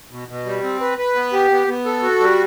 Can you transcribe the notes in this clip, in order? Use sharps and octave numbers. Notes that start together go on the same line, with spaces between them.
B2
B2
G3
C4
B4
B4
B3
G4
B3
B3
A4
F#4
G3